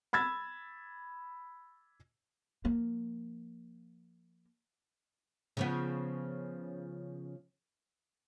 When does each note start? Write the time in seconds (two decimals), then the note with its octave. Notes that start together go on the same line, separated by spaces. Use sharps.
0.13 B5 E6 G#6 A6
2.65 F3 A#3
5.57 C#3 F3 B3